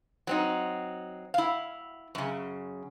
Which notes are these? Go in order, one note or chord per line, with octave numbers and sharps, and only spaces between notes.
F#3 C4 D#4
E4 F5
F#2 C#3